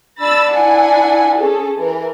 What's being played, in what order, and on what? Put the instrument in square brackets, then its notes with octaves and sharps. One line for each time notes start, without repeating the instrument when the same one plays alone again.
[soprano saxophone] D4 [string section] B5 E6 A6
[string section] E4 F#5 G#5
C#4 G#4 A4
E3 A#4